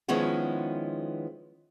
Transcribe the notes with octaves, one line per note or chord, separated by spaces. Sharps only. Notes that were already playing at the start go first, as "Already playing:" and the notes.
D#3 F3 G#3 B3 C#4 E4